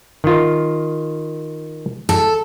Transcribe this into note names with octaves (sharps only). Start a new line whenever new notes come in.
D#3 F4
A4